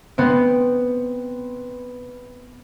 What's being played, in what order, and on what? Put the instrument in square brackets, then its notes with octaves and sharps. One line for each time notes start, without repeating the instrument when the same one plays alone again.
[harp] B3 C4